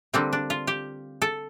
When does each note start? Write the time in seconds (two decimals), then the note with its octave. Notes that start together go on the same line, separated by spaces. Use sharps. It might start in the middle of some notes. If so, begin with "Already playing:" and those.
0.14 D3 G3 A#3 C4
0.33 D4
0.50 F4
0.67 G4
1.22 A4